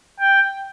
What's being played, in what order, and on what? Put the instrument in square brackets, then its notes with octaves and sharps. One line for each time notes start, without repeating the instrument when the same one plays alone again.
[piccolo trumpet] G5